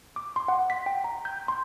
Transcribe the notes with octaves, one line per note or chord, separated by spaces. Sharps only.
D6
C6
F#5
B6
G5
A#5
G6
C6